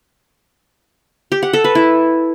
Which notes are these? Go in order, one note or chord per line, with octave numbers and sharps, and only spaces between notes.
G4
F#5
A4
B4
E4